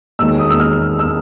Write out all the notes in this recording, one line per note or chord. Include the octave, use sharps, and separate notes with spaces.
E1 D#2 D#3 E6
D#6
E6
F6
E6